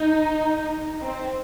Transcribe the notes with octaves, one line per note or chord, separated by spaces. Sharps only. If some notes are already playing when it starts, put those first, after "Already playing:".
Already playing: D#4
C4